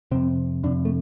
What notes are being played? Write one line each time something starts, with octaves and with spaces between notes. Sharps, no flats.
F2 C3 C4
F2 C3 D4
A3